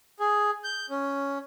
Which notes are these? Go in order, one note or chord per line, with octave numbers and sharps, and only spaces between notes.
G#4
G6
C#4